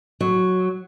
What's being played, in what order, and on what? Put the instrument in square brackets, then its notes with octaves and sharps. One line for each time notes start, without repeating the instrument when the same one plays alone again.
[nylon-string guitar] F#3